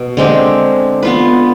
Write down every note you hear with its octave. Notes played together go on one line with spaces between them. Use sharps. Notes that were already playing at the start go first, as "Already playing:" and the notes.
Already playing: B2
D3 G#3 C4 G4
B3 F4 B4